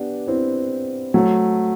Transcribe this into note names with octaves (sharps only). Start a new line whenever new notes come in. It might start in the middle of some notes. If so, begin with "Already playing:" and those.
Already playing: B3 D4 G4 B4
C4 E4
F#3 A3